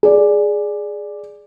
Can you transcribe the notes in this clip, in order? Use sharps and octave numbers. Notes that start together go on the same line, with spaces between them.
G#4 D5